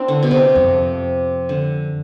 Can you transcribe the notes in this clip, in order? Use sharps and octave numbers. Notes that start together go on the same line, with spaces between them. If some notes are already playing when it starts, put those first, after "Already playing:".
Already playing: C4 D4 E4
D3
B2
C3
F2
D3